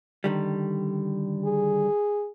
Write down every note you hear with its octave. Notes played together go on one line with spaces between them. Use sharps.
D3 D#3 G3
G#4